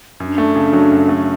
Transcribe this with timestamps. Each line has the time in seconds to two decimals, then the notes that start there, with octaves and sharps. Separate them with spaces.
0.20 F#2 D4
0.38 A3
0.56 C#3
0.73 F#3
0.92 F#2
1.09 A3